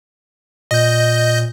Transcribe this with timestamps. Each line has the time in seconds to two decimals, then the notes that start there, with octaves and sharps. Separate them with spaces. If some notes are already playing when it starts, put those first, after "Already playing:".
0.71 A#2 D#5 G6